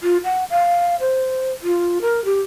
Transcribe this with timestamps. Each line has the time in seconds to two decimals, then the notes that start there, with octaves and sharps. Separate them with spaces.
0.03 F4
0.24 F#5
0.50 F5
1.00 C5
1.63 F4
2.01 A#4
2.25 G4